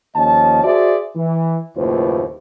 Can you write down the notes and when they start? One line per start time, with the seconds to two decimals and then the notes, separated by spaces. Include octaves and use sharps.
0.15 D#2 F3 C#4 D#5 A5
0.64 F#4 G#4 C5 D5 E5
1.16 E3
1.76 F#1 D#2 A2 F4 B4 C5